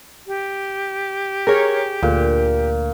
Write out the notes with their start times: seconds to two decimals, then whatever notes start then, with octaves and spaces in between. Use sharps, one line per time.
0.27 G4
1.47 G#4 A#4 C#5
2.03 D2 A#2